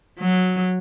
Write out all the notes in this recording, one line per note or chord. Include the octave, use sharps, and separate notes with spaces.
F#3